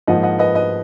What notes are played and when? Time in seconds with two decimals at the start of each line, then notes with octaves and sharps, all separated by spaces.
0.07 G#2 F3 A#3 D#5 F#5
0.23 D#5 F#5
0.39 B4 D#5
0.55 B4 D#5